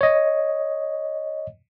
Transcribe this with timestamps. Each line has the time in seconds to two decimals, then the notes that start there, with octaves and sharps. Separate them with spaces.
0.01 C#5 D#5